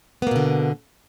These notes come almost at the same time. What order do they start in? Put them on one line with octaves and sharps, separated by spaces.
B3 A#3 B2 D3